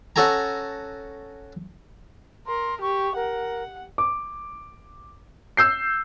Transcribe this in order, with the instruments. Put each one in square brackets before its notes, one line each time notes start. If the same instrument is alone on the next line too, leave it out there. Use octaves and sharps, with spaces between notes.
[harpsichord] C#4 F#4 A4 G#5 A#5
[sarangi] A#4 [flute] C6
[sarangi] G4 [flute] C#6
[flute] A#4 [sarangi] F#5
[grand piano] D6
E6 G6 C7